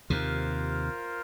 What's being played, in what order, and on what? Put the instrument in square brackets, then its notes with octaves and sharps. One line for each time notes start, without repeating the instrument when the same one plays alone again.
[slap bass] D#2 C3 [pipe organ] F4 A#4 C5